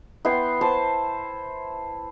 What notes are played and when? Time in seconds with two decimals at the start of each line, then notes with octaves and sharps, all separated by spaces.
0.25 B3 E4 G5 C6
0.61 C5 A5